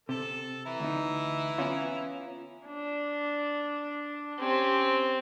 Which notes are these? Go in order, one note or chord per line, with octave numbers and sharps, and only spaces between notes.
C3 A4
E3 E4 A#5
D2 D#4
B3 C#4 F4
D4
C4 C#4 G4